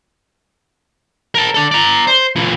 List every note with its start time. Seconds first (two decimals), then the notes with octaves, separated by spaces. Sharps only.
1.35 A#4 A5
1.54 A4 D5
1.71 D5 A#5
2.07 C5
2.36 A#2 E3